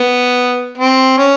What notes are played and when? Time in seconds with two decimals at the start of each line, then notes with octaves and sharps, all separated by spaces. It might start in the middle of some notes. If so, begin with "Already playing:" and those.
Already playing: B3
0.77 C4
1.18 C#4